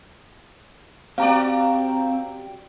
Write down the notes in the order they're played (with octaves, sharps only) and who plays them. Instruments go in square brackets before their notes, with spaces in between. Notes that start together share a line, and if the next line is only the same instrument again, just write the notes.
[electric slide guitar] C4 [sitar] F#4 G4 D5 [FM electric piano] F5 A#5